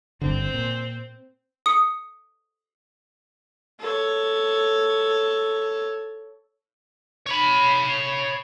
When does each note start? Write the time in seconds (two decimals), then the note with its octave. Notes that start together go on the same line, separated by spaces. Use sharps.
0.21 G1 G2 D3 C4
0.54 A#2
1.66 D#6 C#7
3.80 A4 C#5
7.26 C#5 B5